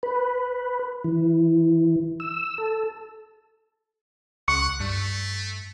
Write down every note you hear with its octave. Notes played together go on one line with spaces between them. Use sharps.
B4
E3
E6
A4
C#2 F#5 C#6
G2 A3